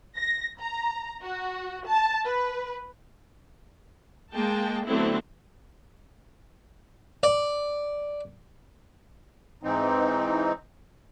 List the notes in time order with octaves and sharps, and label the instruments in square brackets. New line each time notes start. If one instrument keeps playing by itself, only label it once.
[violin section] A#6
A#5
F#4
A5
B4
[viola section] G#3 A#3 G5 A5
D3 F#3 A3 B3 C4 E4
[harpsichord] D5
[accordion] G#2 E3 C4 D#4